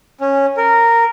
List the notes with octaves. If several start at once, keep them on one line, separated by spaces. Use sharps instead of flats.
C#4
A#4